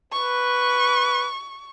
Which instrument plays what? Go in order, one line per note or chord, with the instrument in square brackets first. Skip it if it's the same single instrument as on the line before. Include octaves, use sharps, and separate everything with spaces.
[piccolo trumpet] B4 [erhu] C#6